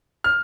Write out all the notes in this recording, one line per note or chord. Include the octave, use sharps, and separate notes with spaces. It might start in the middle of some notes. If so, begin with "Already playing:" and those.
F6